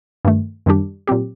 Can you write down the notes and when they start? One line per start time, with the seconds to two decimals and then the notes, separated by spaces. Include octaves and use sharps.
0.25 G2 D#3 A3
0.66 F#2 D#3 G3 D4 G4
1.07 A#2 F#3 C4 G4